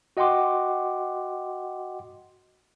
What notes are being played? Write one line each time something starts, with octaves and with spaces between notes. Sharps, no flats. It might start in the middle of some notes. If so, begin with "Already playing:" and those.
F#4 D#5 F#5 G5 C6 D6